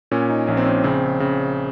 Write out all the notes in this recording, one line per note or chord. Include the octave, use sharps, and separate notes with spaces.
A#2 C#4
D#4
A#1 C#4
C4
C#4
C#3 C4
C#3